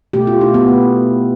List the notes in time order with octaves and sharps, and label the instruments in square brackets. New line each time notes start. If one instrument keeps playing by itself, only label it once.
[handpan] B2 A3 G4
F4
E4
B3
A3